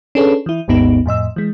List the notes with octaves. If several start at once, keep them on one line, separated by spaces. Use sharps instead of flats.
C#4 D4 G#4 A4 B4 C#5
E3 E4
G#1 D#2 G#2 B3 D#4
F2 A2 D#5 E6
E3 G#3